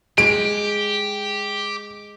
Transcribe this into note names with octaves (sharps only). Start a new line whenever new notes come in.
G#3 G4 D7